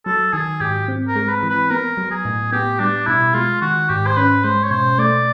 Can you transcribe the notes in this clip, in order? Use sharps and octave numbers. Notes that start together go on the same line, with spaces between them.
F#3 A4
D#3 G#4
G#2 G4
C4
A#4
G#3
B4
E3
B4
B3 A#4
F#3
G#4
A2
B3 G4
G3 D4
B2 E4
G#3 F4
D#3 F#4
G#2 G4
C5
C#4 B4
G#3 C5
C#5
B2 C5
A3 D5